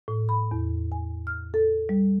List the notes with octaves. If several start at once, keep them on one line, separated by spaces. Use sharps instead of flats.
A2
B5
E2
G#5
F6
A4
G3